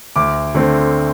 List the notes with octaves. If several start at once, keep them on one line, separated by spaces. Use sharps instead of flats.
D2 D6
D3 A3 C4